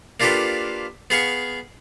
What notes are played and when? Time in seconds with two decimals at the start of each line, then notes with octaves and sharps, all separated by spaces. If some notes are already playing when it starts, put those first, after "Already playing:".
0.20 A#3 D4 F4 G4 A4 B4
1.10 B3 G#4 F5 C#6